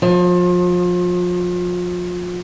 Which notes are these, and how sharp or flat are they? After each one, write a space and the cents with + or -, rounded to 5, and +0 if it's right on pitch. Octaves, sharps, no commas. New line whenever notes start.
F3 +30